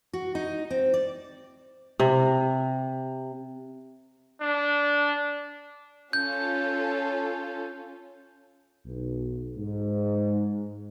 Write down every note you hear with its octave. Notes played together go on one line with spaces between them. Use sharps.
F#4
D#4
C4
D5
C3
D4
C#4 F4 A4 G6
B1
G#2